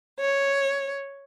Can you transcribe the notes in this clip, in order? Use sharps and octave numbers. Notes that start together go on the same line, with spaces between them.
C#5